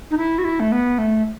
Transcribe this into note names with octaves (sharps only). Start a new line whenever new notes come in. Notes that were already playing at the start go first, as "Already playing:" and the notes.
D#4
E4
F#4
E4
A3
B3
A3